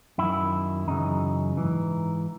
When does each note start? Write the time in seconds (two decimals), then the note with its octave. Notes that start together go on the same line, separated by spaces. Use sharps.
0.18 F#2 D#3 E4
0.88 F#2 C#3 E3 D#4
1.57 G#2 E3